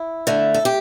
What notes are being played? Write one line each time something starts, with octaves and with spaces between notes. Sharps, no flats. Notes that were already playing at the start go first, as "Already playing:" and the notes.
Already playing: E4
D3 A3
A4
G4